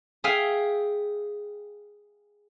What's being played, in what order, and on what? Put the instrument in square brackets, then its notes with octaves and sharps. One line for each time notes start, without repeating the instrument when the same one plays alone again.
[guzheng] G#4 E5 F5 G5 G#5